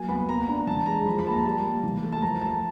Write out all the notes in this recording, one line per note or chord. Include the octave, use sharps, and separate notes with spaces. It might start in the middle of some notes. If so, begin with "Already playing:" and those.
Already playing: F#3 A#3 G#5
B3 B5
A#3 A#5
D4 A#5
E3 A5
G#3 A#5
F3 B5
B5
A#3 A5
A#5
G3 A5
A#3
E3
A3
A5
F3 A#5
A3 A5